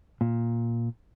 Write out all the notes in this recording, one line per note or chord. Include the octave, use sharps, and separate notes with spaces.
A#2